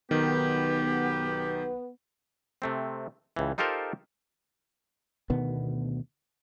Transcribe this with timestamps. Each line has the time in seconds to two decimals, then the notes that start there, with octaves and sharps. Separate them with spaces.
0.11 B1 D#3 B3 G4
2.62 C3 A3 C4
3.36 C#2 E3
3.58 D#4 F4 G4 A4 A#4 C5
5.30 D2 B2 D#3 B3